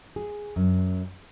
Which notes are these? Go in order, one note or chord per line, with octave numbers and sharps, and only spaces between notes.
G#4
F#2